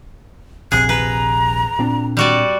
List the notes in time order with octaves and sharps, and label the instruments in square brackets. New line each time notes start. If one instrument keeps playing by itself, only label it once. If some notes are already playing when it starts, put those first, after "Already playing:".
[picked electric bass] D#1 A#1 C3 [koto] G#4 [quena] F#6
[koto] B4 [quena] A#5
[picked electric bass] A#2 C4 D4
[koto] G3 F#4 D5